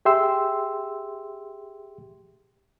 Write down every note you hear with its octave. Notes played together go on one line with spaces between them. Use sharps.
G4 G#4 E5 G5 C6 E6